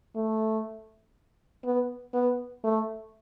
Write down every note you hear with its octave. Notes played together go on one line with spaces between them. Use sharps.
A3
B3
B3
A3